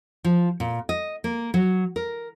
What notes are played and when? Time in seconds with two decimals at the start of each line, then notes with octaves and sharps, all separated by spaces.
0.24 F3
0.60 A#2
0.89 D#5
1.24 A#3
1.54 F#3
1.96 A#4